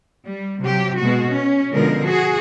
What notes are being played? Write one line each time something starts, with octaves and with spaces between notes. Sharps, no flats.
G3
C3 F#3 G4
B2 G#3 F#4
C#4
B2 D3 F3 G#3 A#4
F#4 G#4